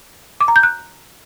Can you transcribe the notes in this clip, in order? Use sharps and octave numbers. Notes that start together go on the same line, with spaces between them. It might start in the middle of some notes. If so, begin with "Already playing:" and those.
D6
A#5
G6
F#6